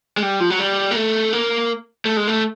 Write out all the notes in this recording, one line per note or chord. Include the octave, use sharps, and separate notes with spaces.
G#3
G3
F3
F#3
G3
A#3
A3
A#3
A3
G#3
A3